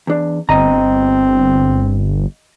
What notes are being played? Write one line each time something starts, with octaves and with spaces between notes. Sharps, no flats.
E2 D4
G1 C4 D#5 A#5